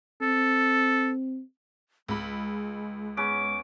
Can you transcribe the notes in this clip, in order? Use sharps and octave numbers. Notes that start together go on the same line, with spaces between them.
C4 A4
C#2 G#3 B5
B3 C#4 G#4 D6